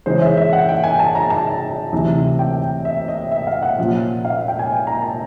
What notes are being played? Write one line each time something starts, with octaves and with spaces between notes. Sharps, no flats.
C#3 E3 G#3 C#4 C5
E5
E5
F#5
G5
G#5
A5
A#5
A5
D2 C3 E3
G5
E5
D#5
E5
F5
F#5
A#2 F3 A#3 C#4
F5
E5
G5
G#5
A#5
A5